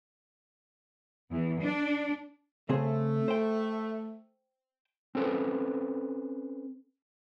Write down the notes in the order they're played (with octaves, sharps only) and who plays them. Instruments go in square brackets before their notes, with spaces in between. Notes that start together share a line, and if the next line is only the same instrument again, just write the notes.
[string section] E2
D4
[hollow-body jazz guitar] C#3 C4 G#4 [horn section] A3
[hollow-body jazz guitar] C5 G5
[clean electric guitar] C4 C#4 A4 B4 C5